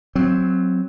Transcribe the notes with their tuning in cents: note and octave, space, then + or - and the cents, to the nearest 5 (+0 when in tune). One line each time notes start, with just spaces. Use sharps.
F#3 +0 C4 +0